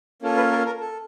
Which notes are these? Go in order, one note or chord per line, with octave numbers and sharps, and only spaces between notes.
A#3 C#4 F4 A4
B4
A#4
A#4
A4